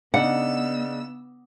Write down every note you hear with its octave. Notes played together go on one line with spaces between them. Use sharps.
C#3 B3 D4 D#4 F#5 E6